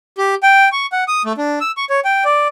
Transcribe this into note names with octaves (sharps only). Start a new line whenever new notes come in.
G4
G5
C#6
F#5
D#6
A3
D4
E6
C#6
C#5
G5
D5